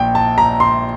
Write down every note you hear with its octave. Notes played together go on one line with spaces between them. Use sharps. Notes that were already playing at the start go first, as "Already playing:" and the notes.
Already playing: A#1 A#2 G5
A5
A#5
C6